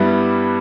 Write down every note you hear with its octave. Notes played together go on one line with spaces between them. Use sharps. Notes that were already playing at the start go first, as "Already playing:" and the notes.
Already playing: G2 G3 B3 E4